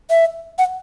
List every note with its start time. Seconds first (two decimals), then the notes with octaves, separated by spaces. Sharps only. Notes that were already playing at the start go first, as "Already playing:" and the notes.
0.10 E5
0.59 F#5